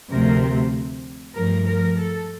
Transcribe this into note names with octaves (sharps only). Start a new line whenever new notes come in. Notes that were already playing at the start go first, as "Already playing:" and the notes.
D2 C3 F3 A3 A#4
G2 F3 A3 A#4
A#4
A4